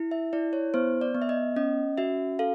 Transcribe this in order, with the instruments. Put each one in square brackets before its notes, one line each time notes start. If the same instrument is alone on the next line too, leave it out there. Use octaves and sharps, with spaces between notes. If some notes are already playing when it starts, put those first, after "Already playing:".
Already playing: [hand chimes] E4
E5
E4 D5
C#5
B3 C5
D5
B3
E5
D#5
C#4 D#5
F#4 E5
A4 F5